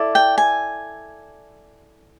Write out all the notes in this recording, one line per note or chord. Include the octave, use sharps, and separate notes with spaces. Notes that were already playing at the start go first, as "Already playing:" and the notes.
Already playing: E4 A4 D5
G5
G#5